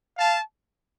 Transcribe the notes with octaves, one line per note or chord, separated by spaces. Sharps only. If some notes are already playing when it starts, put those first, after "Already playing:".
F5 A5